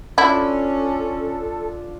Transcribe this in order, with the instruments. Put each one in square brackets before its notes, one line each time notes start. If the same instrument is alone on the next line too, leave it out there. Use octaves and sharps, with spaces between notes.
[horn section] C#4 [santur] D4 F4 [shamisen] E4 [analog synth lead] A4